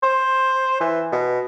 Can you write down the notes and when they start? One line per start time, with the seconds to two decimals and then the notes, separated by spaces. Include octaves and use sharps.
0.03 C5
0.80 E3
1.13 B2